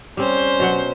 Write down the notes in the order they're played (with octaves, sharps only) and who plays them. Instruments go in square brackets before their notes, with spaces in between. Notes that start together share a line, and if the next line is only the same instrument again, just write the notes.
[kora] G3 C4 [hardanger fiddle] C#4 C5
[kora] B2 F#3 F#5